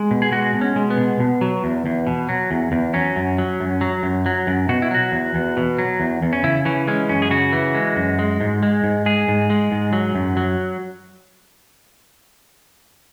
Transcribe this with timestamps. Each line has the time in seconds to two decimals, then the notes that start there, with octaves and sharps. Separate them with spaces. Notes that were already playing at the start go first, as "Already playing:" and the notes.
Already playing: G#3
0.11 B2
0.22 G#4
0.32 G#3 F#4
0.55 B2
0.61 C#4
0.76 G#3
0.90 B3
0.98 B2
1.20 B2
1.41 F#3
1.64 E2
1.86 E2
2.07 B2
2.29 F#3
2.51 E2
2.72 E2
2.94 F#3 C#4
3.16 F#2
3.38 F#3
3.60 F#2
3.81 F#3
4.03 F#2
4.26 F#3
4.47 F#2
4.69 B2 F#4
4.82 E4
4.91 F#3 F#4
5.12 E2
5.35 E2
5.57 B2
5.79 F#3
6.00 E2
6.22 E2
6.33 C#4
6.44 C#3 E4
6.65 E3 C#4
6.87 G#3 C#4
7.09 F#2 C#4
7.22 G#4
7.31 C#3 F#4
7.52 E3
7.75 G#3
7.96 F#2
8.19 G#3
8.41 G#2
8.63 G#3
8.84 G#2
9.06 G#3 G#4
9.28 G#2
9.50 G#3
9.72 G#2
9.93 F#3
10.15 F#2
10.37 F#3